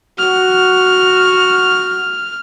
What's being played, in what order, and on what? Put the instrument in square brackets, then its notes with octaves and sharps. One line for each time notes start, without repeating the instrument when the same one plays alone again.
[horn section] F#4 [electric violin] F6